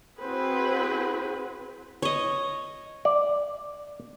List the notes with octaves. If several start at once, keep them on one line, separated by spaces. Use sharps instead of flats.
C4 E4 F#4 G#4 B4 C5
C#5 D#5
D5